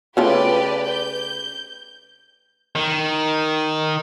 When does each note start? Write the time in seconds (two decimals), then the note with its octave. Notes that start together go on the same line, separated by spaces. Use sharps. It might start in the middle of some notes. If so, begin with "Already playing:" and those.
0.17 C#3 A3 F4 G4 B4 D5
0.88 G6
2.75 D#3